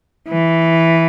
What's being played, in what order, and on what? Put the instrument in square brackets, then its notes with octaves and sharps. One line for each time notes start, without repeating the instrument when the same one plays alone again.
[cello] E3